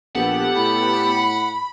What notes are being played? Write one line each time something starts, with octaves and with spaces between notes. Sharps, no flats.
A#1 B3 G4 A4 F#5
A2 B5